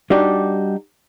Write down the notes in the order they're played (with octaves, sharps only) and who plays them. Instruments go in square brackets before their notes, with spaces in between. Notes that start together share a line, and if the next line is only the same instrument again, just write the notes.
[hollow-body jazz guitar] G3 D4 D#4 F#4 G4